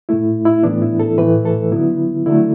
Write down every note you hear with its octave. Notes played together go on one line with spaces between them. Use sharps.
A2 A3 E4
E4
A2 E3 B3 D4
E4
A4
A2 E3 A3 B4
A4
D3 F#3 B3 E4
D3 F#3 A3 E4